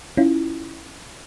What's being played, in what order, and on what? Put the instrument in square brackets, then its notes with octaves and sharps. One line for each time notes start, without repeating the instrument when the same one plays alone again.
[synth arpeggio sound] C#4 E4 F4